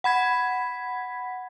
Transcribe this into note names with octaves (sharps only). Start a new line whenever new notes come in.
F#5 B5 G#6 B6